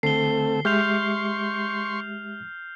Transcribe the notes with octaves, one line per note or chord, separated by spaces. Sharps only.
D3 A3 C4 A4 C7 G7
G#3 G4 E5 C6 C#6 F6 G6 F7